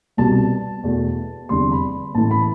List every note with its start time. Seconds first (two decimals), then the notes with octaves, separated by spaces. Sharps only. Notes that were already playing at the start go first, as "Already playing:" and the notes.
0.17 C2 B2 G3 A5
0.83 E2 B2 A3
1.49 F1 E2 D3 G3 C6
1.72 B5
2.15 A1 A2 E3 A3 A5
2.31 B5